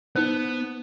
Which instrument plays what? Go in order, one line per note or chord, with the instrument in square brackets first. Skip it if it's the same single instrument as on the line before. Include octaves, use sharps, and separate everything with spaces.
[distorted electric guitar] B3 [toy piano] D#4 C5